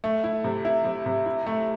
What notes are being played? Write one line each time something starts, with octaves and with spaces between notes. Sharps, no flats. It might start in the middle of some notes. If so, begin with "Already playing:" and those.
A3
E4
C3
E4
C3
C3
E4
A3